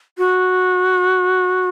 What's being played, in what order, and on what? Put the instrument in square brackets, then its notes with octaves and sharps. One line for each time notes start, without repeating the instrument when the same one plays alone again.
[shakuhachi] F#4